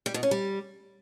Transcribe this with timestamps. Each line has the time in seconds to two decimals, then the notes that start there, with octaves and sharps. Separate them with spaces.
0.06 G3
0.14 B2
0.23 C#4
0.31 G3